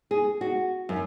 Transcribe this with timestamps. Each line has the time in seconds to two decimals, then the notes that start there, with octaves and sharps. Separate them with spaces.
0.11 G#4
0.41 F#4
0.89 F#2